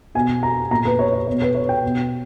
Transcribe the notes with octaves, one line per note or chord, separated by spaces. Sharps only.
B2 G#5
A#5
A#2 A#5
B4
C#5
C#5
B2 C#5
B4
C#5
G5
B2